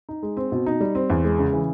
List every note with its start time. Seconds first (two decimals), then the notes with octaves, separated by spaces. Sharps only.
0.09 D#4
0.23 G#3
0.37 C4
0.52 B2
0.66 D#4
0.80 G3
0.95 C4
1.10 E2
1.24 G#3
1.39 C#3
1.53 E3